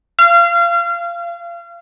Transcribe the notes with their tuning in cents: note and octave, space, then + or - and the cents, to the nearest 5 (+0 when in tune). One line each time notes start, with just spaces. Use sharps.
F5 -30